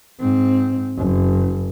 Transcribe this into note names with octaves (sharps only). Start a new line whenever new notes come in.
G#2 C4
F#1